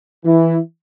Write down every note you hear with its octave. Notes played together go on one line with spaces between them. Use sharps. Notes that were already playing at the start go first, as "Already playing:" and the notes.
E3 E4